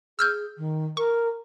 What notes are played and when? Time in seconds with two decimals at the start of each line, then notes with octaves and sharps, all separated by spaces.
0.19 G#4 E6 F6 G6
0.57 D#3
0.97 A#4 C#6